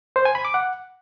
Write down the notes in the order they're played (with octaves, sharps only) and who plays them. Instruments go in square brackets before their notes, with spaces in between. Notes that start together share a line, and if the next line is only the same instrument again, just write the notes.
[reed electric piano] C5
G#5
B5
D6
F#5